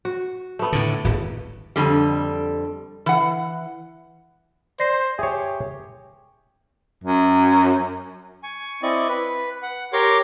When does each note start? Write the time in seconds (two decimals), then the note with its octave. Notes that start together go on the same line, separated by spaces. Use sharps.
0.05 F#4
0.59 A3 B3
0.72 A2 D3
1.04 D1 G#1
1.76 F2 D3 G3
3.06 E3 F#5
4.79 C5 D5 A#6 C7
5.19 G4 G#4 C#5 E5
7.04 F#2
8.43 G#5 C#6
8.83 C4 E4 D5 D#5 C#6
9.08 B4
9.62 F#5
9.93 G4 A#4 C#5 C6 D6